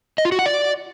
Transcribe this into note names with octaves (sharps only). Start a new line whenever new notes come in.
D#5
F4
F#4
F#5
D5